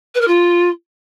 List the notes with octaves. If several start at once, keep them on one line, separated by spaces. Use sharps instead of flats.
B4
A#4
F4